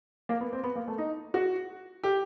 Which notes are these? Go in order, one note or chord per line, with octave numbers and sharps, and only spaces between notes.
A#3
B3
C4
B3
A#3
A3
D#4
F#4
G4